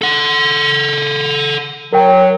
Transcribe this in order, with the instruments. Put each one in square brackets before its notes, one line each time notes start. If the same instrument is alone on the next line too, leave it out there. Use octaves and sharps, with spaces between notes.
[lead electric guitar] A4 F#5
[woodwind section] F#3 [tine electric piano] A#4 G5